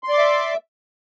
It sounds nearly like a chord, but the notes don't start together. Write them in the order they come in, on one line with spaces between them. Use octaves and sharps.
C6 D5 D6 E5